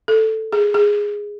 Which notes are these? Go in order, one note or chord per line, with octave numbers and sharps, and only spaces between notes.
A4
G#4
G#4